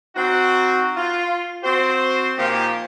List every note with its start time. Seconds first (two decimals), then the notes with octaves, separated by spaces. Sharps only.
0.15 C4 D#4 F#4
0.95 F4
1.63 C4 F#4 C5
2.37 A#2 D#3 F3 A#3 G4